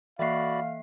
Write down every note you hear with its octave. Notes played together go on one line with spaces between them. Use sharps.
E3 A#3 F#4 D5 E5 F5 B5 C7